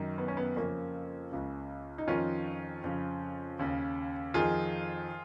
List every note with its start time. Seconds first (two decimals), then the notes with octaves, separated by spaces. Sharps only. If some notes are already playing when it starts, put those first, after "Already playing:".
Already playing: F#2 D#3
0.18 B3
0.28 C#4
0.37 B3
0.56 F2 C#3 A#3 C#4
1.32 C#2 C#3
1.98 D#4
2.07 F2 D#3 C#4 F4
2.84 F2 C#3
3.59 D#2 C#3
4.34 F2 D#3 F4 G#4